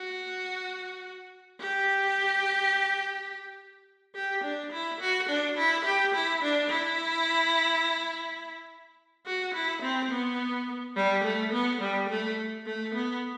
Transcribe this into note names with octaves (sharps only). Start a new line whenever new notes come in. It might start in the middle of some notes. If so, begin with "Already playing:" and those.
Already playing: F#4
G4
G4
D4
E4
F#4
D4
E4
G4
E4
D4
E4
F#4
E4
C4
B3
G3
A3
B3
G3
A3
A3
B3